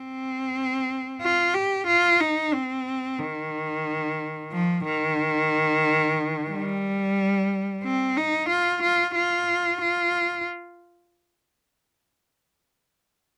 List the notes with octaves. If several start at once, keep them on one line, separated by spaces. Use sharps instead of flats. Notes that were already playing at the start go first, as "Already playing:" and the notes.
Already playing: C4
F4
G4
F4
D#4
C4
D#3
F3
D#3
G3
C4
D#4
F4
F4
F4
F4